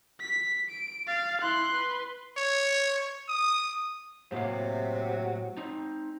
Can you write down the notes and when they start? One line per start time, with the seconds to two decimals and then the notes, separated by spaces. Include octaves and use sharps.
0.21 B6
0.70 D7
1.07 F5 A6
1.42 E4 C6 F#6
1.74 B4
2.37 C#5
3.29 D#6
4.32 A2 C3 F#3 A#3 F5
5.57 C4 D#4